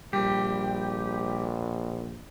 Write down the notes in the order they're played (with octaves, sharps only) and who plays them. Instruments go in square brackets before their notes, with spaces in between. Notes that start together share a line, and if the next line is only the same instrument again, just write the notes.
[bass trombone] A#1 [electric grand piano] G3 [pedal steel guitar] G4